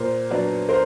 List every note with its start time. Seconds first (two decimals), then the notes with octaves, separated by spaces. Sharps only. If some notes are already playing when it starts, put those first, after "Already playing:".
Already playing: A#2 A#4 C5
0.30 F#3 B3 D4
0.69 A#4 C5